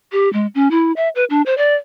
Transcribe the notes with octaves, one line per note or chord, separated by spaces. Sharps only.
G4
G#3
C#4
E4
E5
B4
D4
C5
D5